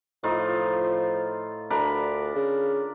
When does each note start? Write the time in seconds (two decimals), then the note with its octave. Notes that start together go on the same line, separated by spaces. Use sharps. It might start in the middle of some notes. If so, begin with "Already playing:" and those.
0.24 A2 F3 D#4 F4
1.70 D2 D4 A#4 B5
2.35 C#3